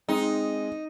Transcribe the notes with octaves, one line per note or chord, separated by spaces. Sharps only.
G#3 C4 D#4